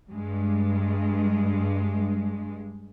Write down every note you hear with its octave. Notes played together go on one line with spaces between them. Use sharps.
G2 G#3